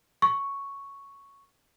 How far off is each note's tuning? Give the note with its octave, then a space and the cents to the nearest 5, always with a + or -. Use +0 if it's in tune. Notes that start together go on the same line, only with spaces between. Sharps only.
C#6 +0